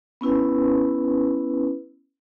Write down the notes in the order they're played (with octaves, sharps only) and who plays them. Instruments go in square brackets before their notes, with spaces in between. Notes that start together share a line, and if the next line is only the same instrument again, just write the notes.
[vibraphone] B3 C#4 E4 B4